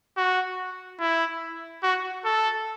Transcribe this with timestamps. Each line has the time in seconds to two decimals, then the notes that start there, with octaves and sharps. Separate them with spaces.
0.17 F#4
1.00 E4
1.83 F#4
2.25 A4